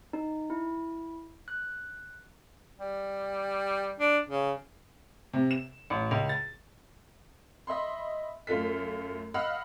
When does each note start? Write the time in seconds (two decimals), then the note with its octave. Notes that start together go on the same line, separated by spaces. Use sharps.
0.13 D#4
0.50 E4
1.48 F#6
2.78 G3
4.00 D4
4.29 C#3
5.33 C3
5.51 E7
5.90 A1
6.11 C#2
6.29 A6
7.67 D#5 E5 B5 C6
8.47 F#2 A3 F4 A4 B6
9.34 D#5 F5 F#5 B5 E6 F6